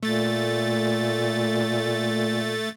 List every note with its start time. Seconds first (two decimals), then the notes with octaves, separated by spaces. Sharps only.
0.03 A#2 A3 A6